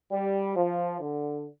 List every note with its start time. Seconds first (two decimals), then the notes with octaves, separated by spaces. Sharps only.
0.12 G3
0.56 F3
1.00 D3